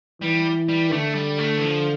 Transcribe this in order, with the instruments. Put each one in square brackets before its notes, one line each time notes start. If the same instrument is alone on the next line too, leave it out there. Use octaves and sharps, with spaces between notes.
[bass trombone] E3 [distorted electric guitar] G3
[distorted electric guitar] G3
[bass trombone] D3 [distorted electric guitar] A3
[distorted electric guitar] G3
A3
E3
F3